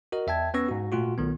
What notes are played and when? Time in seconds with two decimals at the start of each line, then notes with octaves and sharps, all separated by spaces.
0.12 F#4 A#4 D#5
0.27 E2 E5 G5 A5 G#6
0.54 B3 C#4 B4 C#6 E6 A#6
0.68 G#2 F#4
0.92 A#2 A3 F4 F#4
1.18 B1 D#3 B3